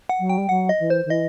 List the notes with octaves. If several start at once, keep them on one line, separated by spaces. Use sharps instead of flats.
F#5
F#3
G5
G3
F#3 F#5
D#5
E3
C5
D#3
E3 D#5